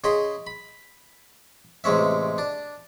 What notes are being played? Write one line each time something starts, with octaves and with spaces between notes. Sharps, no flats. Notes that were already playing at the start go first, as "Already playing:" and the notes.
C#3 G#4 D#5 B5 C6
B5
A1 C3 G#3 C#4 E5
D4